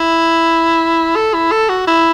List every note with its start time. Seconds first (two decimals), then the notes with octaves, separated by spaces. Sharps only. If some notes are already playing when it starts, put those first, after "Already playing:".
Already playing: E4
1.16 A4
1.34 E4
1.52 A4
1.69 F#4
1.87 E4